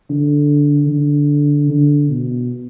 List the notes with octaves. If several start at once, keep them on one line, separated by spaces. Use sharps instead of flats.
D3
D3
D3
B2